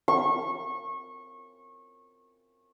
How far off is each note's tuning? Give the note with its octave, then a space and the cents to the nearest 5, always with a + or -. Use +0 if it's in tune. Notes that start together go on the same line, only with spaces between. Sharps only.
C#6 -25